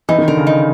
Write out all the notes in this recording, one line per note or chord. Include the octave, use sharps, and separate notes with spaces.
E3 D#4
D#3
D3 A#4
C#3
D#4